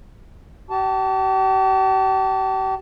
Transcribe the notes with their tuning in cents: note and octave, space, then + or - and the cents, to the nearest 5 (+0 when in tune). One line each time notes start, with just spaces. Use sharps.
G4 -40 A5 +0